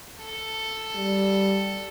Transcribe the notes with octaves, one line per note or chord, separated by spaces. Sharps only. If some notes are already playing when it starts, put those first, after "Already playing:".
A4
G3